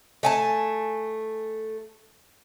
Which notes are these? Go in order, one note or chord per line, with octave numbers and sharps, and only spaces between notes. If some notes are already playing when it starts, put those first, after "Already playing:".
A3 G#5 A5